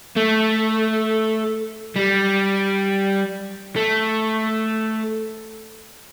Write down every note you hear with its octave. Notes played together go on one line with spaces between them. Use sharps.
A3
G3
A3